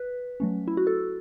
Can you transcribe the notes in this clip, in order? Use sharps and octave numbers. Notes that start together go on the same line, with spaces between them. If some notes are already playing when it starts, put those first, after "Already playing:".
Already playing: B4
F#3 A3 C#4
E4
F#4
A4